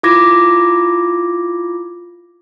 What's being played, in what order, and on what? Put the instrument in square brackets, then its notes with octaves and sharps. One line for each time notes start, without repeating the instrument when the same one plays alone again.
[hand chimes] E4 F4 D6 G#6 A#6